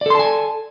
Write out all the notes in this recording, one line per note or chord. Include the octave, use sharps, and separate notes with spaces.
A4 D5 G#5 A5 C6